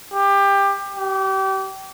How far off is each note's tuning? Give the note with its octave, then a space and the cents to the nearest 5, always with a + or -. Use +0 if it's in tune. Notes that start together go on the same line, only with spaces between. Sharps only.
G4 +20
G4 -30